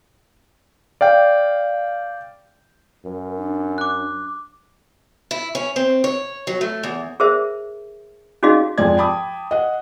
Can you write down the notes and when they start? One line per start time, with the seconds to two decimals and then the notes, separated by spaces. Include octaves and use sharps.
1.01 D5 F5 G5
3.05 F#2 A#4
3.37 D4
3.78 D6 F#6
5.31 E4
5.55 C#4
5.76 C4
6.04 C#5
6.47 F#3
6.61 A3
6.83 E2
7.20 G#4 A#4 C5 E5
8.43 C#4 D#4 F#4 G#4 D#5 F5
8.78 F2 F3 G#3 D5 G#6
8.97 G5 A5 B5 D6 D#6
9.51 D#5 F#5